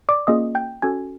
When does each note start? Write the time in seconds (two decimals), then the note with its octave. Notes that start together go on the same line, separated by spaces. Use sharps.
0.09 D5 D6
0.27 A#3 C#4 F4 G#4 D#5 D#6
0.55 G5 G6
0.82 C#4 F#4 A4 G#5 G#6